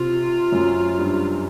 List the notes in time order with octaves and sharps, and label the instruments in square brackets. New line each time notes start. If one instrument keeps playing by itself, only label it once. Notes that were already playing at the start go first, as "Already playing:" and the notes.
Already playing: [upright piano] C3 [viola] F4
[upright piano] F#2
G2